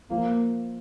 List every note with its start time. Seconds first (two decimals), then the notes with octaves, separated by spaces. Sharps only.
0.10 F3 A#3